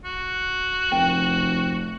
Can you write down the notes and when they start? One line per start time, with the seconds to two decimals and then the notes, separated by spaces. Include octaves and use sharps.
0.04 F#4
0.91 F1 A#4 G5 A5